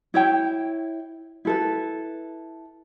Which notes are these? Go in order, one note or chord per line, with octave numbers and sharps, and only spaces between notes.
E4 C#5 G5
E4 A4 B4